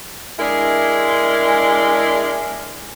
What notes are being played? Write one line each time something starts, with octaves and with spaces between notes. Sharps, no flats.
G#3 D4 E4 G#4 A#4